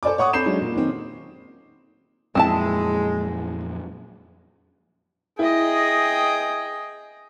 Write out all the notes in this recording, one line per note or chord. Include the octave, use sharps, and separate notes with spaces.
A4 C5 D5 G#5 D6
C#5 F#5 C#6 D#6
C4 A4 B5 G6 C7 E7
F#3 G#3 C#4 D4
A#2
D#3 C4
F2 A#2 F#3 G#3 C4 E4 A5
E4 G#4 D#5 G5